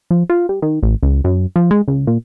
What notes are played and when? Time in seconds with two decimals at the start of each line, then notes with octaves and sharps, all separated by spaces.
0.11 F3
0.30 F4
0.49 G3
0.62 D#3
0.83 A1
1.03 C#2
1.24 F#2
1.56 F3
1.71 G#3
1.88 C#2
2.07 A#2